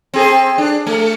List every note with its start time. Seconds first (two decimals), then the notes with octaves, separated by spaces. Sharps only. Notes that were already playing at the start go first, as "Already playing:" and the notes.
0.14 C4 G#4 A4
0.58 D4
0.87 A3